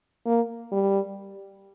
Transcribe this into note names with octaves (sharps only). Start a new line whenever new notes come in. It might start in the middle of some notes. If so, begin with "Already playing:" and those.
A#3
G3